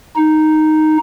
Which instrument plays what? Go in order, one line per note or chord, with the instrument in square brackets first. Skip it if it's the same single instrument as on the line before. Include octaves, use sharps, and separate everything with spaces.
[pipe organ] D#4